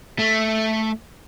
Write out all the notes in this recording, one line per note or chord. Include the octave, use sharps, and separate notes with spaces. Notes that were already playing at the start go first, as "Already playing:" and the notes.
A3